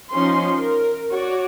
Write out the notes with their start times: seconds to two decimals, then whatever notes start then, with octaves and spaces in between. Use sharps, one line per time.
0.11 F3 C#4 D#4 C6
0.57 A#4
1.10 F#4 C#5 D5